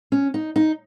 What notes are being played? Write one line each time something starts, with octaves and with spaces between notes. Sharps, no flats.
C#4
D#4
D#4